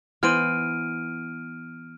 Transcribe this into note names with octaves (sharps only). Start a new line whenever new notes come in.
E3 B3 C5 F6 D7 D#7